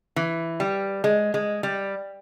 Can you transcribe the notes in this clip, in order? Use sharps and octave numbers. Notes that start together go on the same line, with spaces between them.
E3
G3
G#3
G#3
G3